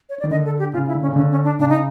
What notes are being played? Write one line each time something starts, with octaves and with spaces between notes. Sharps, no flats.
C#5
D5
D#3
D3 D#5
A4
G4
C#3 F4
E4
D3
C#4
C#3
D3 C#4
C#4
D4
C#3 D4
D#4